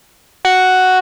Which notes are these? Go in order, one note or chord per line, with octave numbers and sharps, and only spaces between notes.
F#4